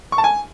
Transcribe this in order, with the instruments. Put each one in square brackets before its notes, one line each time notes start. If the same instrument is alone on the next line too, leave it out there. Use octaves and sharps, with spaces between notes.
[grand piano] C#6
A5
G#5